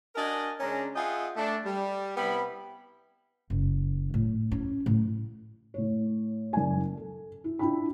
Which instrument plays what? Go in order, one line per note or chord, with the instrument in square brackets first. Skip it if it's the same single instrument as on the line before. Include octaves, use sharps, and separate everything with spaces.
[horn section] D4 F#4 A#4 D#5 G#5
C#3 G#3 C#4 D4 A#5
F4 G#4 D#5 E5 F#5 G5
A3 D4
G3
C3 G3 B3 E4 B5
[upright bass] F#1
A2
C#4
A2
[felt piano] A2 C#5
F#1 D5 G#5
A4
E4
D4 E4 F4 G5 B5